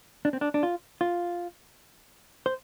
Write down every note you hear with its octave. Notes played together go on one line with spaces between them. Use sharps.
D4
C4
D4
D4
F4
F4
C5